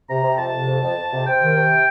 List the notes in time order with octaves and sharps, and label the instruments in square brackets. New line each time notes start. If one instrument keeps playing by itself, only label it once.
[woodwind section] C3 A#5
C3
F2 A5
C3
F2
F2
F2
C3
C3 G5
D#3
C3